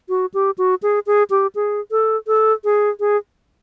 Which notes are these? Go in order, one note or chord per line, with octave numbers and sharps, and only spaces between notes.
F#4
G4
F#4
G#4
G#4
G4
G#4
A4
A4
G#4
G#4